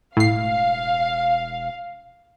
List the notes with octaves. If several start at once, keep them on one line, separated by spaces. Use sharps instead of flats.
E1 A2 F5 C7